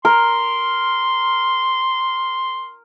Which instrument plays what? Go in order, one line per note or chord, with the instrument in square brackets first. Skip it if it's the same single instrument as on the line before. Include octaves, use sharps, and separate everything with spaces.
[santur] A#4 [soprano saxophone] C6